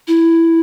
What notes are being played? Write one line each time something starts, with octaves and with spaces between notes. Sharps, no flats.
E4